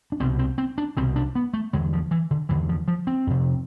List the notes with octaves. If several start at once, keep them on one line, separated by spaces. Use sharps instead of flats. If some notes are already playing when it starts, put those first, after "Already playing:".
D4
C2 B2 C4
C4
C4
D4
C2 B2 C4
D4
B3
A3
E2 D3 G#3
F3
E3
D3
E2 D3 E3
F3
F3
C4
F2 C3